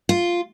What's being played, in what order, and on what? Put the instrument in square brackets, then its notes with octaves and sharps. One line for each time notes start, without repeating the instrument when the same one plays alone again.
[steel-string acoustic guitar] F4